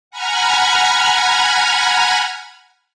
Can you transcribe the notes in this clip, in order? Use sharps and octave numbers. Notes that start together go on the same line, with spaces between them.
F#5 G#5 A#5 B5 F6 G#6